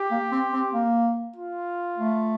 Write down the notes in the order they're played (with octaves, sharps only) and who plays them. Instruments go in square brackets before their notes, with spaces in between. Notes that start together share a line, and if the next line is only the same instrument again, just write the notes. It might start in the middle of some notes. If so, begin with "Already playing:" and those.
Already playing: [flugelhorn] G4
[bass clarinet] A#3
C4
C4
A#3
[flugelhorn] F4
[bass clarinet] A3